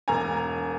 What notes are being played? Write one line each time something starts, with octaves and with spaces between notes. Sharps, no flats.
E1 G#5 A#5